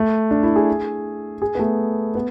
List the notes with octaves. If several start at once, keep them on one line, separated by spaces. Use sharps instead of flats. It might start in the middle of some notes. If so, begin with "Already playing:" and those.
Already playing: A3
D4
E4
G#4
G#4
B3
A3
B3